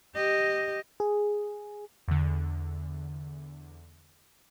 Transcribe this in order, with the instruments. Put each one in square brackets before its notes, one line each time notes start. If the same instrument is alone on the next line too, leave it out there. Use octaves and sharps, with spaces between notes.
[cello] G4 D#5
[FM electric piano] G#4
[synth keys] E2 D3